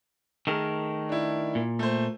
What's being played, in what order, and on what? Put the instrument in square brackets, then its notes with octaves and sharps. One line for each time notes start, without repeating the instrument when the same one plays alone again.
[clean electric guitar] D#3 A3 A#4 [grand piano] G#4
[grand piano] D4 E4
[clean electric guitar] A#2
[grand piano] A3 C5